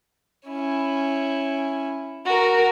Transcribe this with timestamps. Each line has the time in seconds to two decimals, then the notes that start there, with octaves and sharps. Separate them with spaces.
0.47 C#4 E4
2.26 F#4 A#4